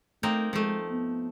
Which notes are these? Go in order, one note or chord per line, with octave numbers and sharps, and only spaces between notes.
A3 A#3 C4 D#4
F3 G#3 A3
B3